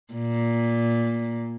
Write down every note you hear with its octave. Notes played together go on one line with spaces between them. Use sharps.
A#2